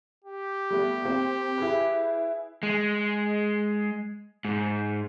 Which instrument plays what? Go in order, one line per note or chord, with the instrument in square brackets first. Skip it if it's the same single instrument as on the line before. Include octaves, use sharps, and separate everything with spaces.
[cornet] G4
[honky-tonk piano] G3 A3 B3
A#3 C4
E4 G#4 B4
[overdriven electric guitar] G#3
G#2